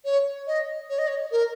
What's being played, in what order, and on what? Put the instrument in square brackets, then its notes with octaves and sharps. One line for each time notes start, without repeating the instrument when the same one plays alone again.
[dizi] C#5
D#5
C#5
D#5
C#5
A#4